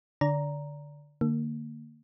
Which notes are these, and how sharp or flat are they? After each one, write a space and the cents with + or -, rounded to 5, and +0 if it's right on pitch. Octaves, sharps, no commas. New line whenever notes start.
D3 +0 D5 -25 A#5 +0
D3 +25 A#3 -20